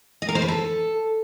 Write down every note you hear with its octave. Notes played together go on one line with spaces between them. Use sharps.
D#5
A#4
C5
B4
A4